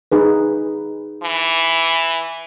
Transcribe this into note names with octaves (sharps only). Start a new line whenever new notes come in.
D#4 G#4 B4
E3